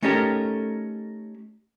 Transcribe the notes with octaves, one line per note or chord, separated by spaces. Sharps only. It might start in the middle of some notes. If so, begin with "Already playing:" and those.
A3 C#4 D#4 G4 A4 A#4